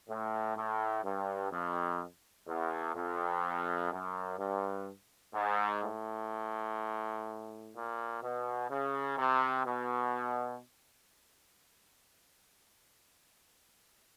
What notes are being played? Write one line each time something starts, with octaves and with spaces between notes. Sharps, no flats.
A2
A2
G2
F2
E2
F2
F#2
G2
G#2
A2
A#2
B2
C#3
C3
B2